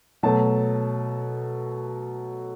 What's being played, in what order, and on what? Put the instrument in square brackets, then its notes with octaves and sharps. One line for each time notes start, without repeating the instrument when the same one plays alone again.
[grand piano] B2 F#3 A3 A5